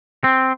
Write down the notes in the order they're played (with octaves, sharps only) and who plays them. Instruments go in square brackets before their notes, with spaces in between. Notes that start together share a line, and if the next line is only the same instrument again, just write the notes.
[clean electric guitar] C4